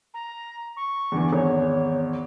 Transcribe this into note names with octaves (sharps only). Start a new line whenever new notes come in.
A#5
C#6
E2 D3 E3
G#1 E2 C#5